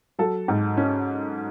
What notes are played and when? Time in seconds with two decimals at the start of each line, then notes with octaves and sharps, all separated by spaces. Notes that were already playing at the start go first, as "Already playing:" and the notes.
0.19 F#3 A4
0.48 G#2
0.77 C#4